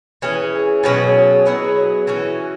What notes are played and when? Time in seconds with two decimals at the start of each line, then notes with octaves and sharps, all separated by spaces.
0.22 E3 C#4 G#4
0.84 B2 F#3 C#4 G#4
1.46 F#3 B3 E4 G#4
2.07 E3 C#4 F#4